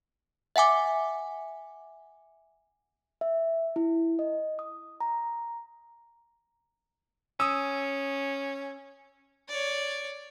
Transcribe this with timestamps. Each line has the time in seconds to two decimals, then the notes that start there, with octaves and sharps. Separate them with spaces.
0.56 E5 F#5 G#5 D6
3.21 E5
3.76 E4
4.19 D#5
4.59 D#6
5.00 A#5
7.40 C#4 D#6 E6
9.49 C#5 D5